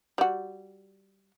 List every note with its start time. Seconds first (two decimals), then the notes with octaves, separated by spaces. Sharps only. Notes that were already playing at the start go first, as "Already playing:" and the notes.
0.18 G3 F#4